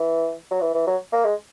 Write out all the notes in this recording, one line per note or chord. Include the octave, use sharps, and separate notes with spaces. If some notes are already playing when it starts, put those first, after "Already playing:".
Already playing: E3
F#3
E3
E3
F#3
A#3
G#3